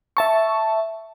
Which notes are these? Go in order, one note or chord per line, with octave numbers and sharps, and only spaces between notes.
E5 A5 C#6